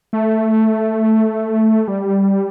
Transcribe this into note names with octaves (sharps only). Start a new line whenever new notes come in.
A3
G3